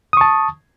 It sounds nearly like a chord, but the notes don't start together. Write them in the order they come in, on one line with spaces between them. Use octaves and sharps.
D#6 C#6 A5